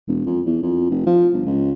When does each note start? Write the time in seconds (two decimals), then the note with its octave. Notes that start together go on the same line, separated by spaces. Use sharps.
0.08 E1
0.26 F2
0.46 E2
0.63 F2
0.90 F1
1.07 F3
1.33 G1
1.46 C#2